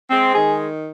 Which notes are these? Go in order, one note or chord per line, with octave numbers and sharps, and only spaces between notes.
G#3 C4
D#3 G#4